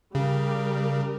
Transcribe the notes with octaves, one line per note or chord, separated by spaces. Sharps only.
C#3 G3 G4 A#4